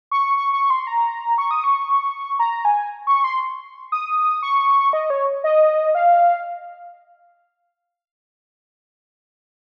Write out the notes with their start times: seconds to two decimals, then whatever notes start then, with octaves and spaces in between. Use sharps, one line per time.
0.11 C#6
0.37 C#6
0.53 C#6
0.70 C6
0.87 A#5
1.38 C#6
1.51 D#6
1.64 C#6
2.39 A#5
2.65 G#5
3.07 C#6
3.24 C6
3.92 D#6
4.43 C#6
4.93 D#5
5.10 C#5
5.44 D#5
5.95 F5